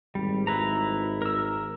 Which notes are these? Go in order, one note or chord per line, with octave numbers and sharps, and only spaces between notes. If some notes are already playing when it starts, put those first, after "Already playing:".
G#1 G3
E4 B4 A#5
A#4 E6